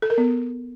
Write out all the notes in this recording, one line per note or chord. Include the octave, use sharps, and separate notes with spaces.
A4
A#4
B3